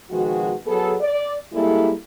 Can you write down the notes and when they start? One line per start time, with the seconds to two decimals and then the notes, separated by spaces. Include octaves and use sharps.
0.10 B2 D#3 F3 G#3 F#4
0.66 F#3 B3 G#4 A4
1.00 D5
1.53 G3 G#3 A#3 E4 G#4 A4